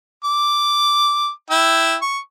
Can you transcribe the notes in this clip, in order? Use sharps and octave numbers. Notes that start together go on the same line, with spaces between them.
D6
E4 G5 E6
C#6